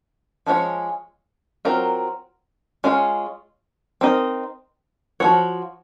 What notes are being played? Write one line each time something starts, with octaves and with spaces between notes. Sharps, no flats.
F3 G#3 C#4 F#4 C#5
F#3 C4 F4 A#4
G#3 C#4 F4 A#4 C#5
C4 D#4 A#4 D#5
F3 C4 F#4 C#5